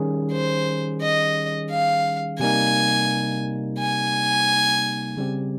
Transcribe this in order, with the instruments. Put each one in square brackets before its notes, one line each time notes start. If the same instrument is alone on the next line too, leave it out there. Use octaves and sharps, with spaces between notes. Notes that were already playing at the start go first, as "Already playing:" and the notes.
Already playing: [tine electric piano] D#3 G3 C#4 G#4
[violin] C5
D#5
F5
[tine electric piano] C3 G3 A#3 D#4 [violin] G#5
[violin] G#5
[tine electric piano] C#3 G3 C4 G4